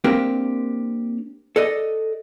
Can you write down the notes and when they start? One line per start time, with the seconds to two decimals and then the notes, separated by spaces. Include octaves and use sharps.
0.04 A#3 C4 D4 G4 A#4 C5
1.56 A4 D5 D#5